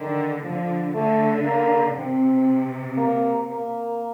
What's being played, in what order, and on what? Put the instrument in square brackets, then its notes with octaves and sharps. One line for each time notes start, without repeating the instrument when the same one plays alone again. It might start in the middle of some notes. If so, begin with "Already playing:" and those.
Already playing: [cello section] D3 [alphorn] D#3
[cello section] D3 [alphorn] F3
[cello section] D3 [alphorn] A3
[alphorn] A#3
[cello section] C3 [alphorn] C4
[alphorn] A#3
A#3